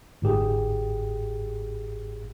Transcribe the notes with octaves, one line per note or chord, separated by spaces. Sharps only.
G1 G#2 G4 G#4